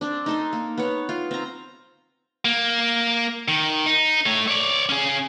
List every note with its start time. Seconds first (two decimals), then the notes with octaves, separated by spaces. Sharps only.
0.01 C4 D4
0.26 D#4 A4 C6
0.53 A#3
0.78 B3 C#5
1.09 F4
1.31 C4 A#5
2.45 A#3
3.48 D#3
3.86 D#4
4.26 A3 C#5
4.48 C#5 D5
4.89 C#4 G#4